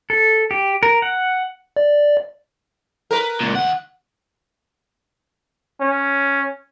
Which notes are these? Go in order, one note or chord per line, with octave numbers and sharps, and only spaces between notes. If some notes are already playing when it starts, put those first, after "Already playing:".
A4
G4
A#4
F#5
D5
A#4 B4
C#2 A#2
D#2 F#5
C#4